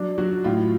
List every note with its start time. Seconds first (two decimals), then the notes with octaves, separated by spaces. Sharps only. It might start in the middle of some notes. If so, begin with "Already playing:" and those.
Already playing: F#3 D4
0.18 F#3 F#4
0.44 A2 F4